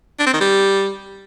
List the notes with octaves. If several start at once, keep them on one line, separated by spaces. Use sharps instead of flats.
D4
C4
D#3
G3